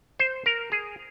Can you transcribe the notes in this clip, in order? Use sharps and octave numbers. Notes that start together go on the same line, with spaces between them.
C5
A#4
G#4